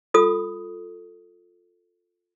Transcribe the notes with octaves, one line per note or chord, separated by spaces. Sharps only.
F4 A4 D#6